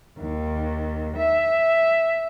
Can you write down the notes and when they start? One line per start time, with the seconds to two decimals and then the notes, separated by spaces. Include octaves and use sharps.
0.19 D#2
1.17 E5